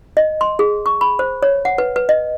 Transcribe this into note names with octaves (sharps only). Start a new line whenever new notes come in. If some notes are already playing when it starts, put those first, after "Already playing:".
D#5
C6
G#4
C#6
B5
C5
C#5
F#5
B4
B4
D#5